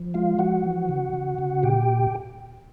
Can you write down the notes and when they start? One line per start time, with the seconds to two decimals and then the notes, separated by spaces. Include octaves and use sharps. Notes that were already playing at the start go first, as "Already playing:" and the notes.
Already playing: F3
0.14 G#3 F4 F5
0.39 F3 F#4 F#5
0.64 E3
0.89 C#3
1.13 C#3
1.38 C#3
1.63 A#2 G4 G5